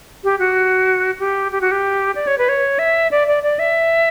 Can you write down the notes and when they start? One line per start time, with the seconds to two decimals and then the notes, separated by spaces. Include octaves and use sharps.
0.24 G4
0.39 F#4
1.19 G4
1.52 G4
1.61 F#4
1.71 G4
2.15 D5
2.27 C#5
2.38 B4
2.49 C#5
2.79 E5
3.11 D5
3.27 D5
3.43 D5
3.59 E5